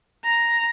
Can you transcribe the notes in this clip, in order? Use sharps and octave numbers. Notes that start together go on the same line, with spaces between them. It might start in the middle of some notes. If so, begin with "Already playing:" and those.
A#5